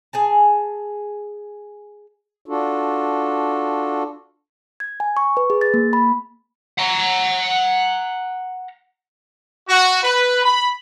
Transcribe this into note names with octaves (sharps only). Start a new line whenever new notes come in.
G#4 G#5 A5
D4 F4 F#4 A4
G#6
G#5
C#6
B4
G#4
A6
A#3
B5
F#5 A#5
F#4
B4
B5